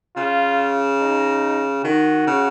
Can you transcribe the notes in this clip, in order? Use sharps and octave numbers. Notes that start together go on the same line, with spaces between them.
C#3 F4
D#4
D#3 F#4
C#3